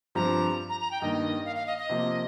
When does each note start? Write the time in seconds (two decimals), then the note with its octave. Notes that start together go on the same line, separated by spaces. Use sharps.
0.15 G2 F3 C4 G4 A#5
0.69 A#5
0.80 A#5
0.91 G5
1.01 G2 D#3 A#3 D#5
1.45 F5
1.56 F5
1.67 D#5
1.78 D#5
1.89 C3 F3 A#3